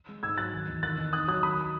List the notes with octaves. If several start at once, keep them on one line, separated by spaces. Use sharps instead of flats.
G#3
G#2 E6 G#6
F#3 F#6 A6
D#3
E2
D#3 F#6 A6
D#3
D#4 D#6 F#6
F#3 D#6 F#6
D#3 B5 D#6